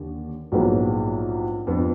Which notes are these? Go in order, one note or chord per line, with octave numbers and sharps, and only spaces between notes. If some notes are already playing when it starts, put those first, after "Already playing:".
Already playing: D#2 D3
A#1 G#2 F#3 B3 D#4
F2 F3 B3 D4